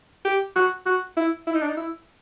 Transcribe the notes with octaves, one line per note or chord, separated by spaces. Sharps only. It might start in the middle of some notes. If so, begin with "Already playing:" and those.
G4
F#4
F#4
E4
E4
D#4
D4
D#4
E4